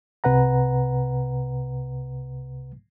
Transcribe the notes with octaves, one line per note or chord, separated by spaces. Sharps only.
C2 C3 B4 F#5 A#5